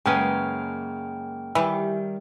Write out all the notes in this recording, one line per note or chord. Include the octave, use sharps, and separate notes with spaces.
F#2 C#3 G#3 A#3 C#4 B4 G5 F6
D#3 E3 G3 G4